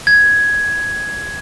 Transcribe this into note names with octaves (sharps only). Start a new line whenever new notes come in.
G#6